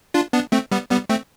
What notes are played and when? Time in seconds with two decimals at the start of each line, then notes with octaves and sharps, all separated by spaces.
0.14 D4 F4
0.33 B3 D4
0.52 A3 C4
0.72 G3 B3
0.91 G3 B3
1.09 A3 C4